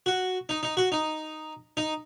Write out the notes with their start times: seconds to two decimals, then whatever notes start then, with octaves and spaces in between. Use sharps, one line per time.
0.06 F#4
0.49 D#4
0.63 D#4
0.77 F#4
0.92 D#4
1.77 D#4